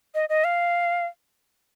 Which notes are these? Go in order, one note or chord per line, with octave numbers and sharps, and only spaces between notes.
D#5
D#5
F5